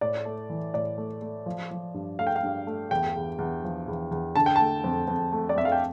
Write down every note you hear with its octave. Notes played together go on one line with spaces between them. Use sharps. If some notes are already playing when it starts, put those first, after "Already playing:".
A2 D5
A3
E3
A2 D5
A3
A3
F3
F3
G2
A3 F5
G5
F5
G2
A3
E2 G5
E2
E2
F3
E2
E2
D3 A5
G5
A3 A5
F2
F2
A3
D5
F2 E5
F5
G5